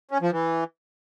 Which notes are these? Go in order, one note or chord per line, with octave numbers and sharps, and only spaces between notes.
C#4
F3
E3